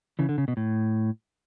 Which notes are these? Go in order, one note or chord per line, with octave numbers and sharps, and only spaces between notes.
C#3 E3
D3
C#3
B2
A2